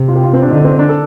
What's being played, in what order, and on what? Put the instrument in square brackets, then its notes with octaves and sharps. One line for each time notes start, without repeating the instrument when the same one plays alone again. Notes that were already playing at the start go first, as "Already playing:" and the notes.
Already playing: [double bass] C3
[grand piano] F4
G4
F4
C4
D4
[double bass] D3 [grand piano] D#4
[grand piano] C4
D4
A4